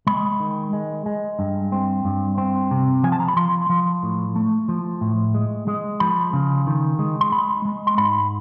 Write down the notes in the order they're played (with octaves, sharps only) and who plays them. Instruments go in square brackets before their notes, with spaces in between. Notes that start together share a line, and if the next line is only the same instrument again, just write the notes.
[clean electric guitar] G#3 B5
D#3
G#3
G#3
G2
C4
G2
C4
C3
F3 G#5
A5
A#5
B5
F3 C6
F3
A2
A3
F3
A2
G#3
G#3
F3 B5
C#3
D#3
G#3
C6
G#3 B5
G#3
C6
G#2 B5